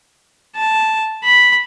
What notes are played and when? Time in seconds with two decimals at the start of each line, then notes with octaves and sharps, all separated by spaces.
0.56 A5
1.24 B5